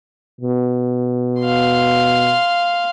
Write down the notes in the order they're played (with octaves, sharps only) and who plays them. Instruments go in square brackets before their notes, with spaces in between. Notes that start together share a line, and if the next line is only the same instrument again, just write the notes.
[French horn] B2
[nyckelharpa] F5 C6